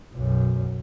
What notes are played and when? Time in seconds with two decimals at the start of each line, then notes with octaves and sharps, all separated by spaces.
0.14 B1 F#2